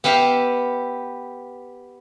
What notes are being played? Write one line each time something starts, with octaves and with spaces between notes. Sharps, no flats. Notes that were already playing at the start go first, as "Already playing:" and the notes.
B3 G4 E5 F5